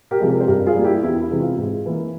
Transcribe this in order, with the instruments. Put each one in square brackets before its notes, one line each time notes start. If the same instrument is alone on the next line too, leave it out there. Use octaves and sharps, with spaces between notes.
[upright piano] G4 A#4
C3 F3 G#3
G4 A#4
C5
G2 G4 A#4
F4 G#4
G3 A#3
E4 G4
E2 E4
E4
C3 E3 G#3
F4
G#2
E3 A#3